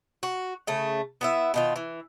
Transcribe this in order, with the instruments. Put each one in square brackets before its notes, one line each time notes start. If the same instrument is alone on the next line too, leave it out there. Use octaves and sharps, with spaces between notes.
[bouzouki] F#4
C#3 A3
B3 E4 E5
B2 D#3 F4
E3